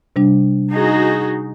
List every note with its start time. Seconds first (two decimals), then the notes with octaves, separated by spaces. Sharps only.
0.16 C3 G3 D4
0.70 D#4 F#4 G#4